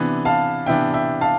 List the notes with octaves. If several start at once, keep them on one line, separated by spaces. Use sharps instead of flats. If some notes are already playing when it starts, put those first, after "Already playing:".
Already playing: C3 E3 B3 D4
F5 A5
C3 E3 B3 D4 E5 G5
E5 G5
F5 A5